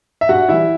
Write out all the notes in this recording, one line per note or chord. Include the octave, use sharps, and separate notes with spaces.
E5
G2 F#4 F#5
E3 G3 E4 E5